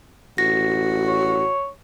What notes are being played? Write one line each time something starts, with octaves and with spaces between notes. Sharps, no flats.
A1 F#4 A#6
C#5